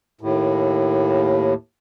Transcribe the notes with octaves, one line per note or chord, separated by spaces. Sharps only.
D#2 A2